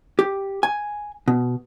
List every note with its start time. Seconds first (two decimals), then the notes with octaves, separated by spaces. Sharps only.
0.19 G4
0.63 G#5
1.28 B2